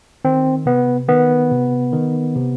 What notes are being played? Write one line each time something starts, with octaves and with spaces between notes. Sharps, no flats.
D#3 C4
C3 B3
D#3 B3
C3
D#3
C3